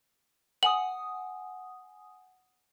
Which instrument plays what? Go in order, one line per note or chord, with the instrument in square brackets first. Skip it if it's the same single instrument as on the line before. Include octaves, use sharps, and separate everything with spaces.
[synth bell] F#5 G#5 D#6 [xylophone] F#7